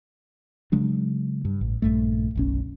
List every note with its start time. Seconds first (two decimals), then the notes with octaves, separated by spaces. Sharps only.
0.72 C#3 F#3 G#3 D4
1.45 G2
1.61 A1
1.82 A#1 G2 A3
2.36 F#1 B1 C#4